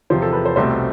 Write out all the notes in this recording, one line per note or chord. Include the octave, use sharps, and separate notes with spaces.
E2 C3 F3 C5
A4
B4
C5
C2 B2 A3 C4 C5